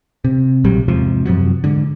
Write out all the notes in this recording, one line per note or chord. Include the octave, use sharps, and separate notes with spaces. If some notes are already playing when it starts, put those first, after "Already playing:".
C3
A#1 C3 F#3 G3
E2 G#2 C3 F3
F#2 C3 F3 F#3
G#2 D3